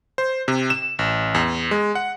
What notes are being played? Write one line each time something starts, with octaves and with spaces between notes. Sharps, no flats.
C5
C3
E7
A1
E2
G#3
F#5